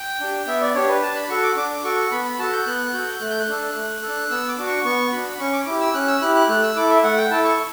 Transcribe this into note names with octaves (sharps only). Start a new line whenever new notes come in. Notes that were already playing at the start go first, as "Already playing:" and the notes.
Already playing: G5
D4 G4
B3 E5
D5
D4 G4 C#5
B4
D4 A5
B5
F#4 A4 C#6
D6
D4 D6
F#4 A4 C#6
B3 B5
B5
F#4 A4 A5
G6
B3 F#6
F#4 A4 G6
A3 F#6
G6
F#6
D4 A4
A3
D4 A4
B3 E6
D6
D4 F#4
C#6
B3 C#6
D4 F#4 B5
C#4 C#6
D6
E4 G4 D6
E6
C#4 F#6
E6
E4 G4 F#6
F#6
A3 F#6
E6
E4 A4 D6
E5
A3 F#5
G5
E4 A4 A5
C#6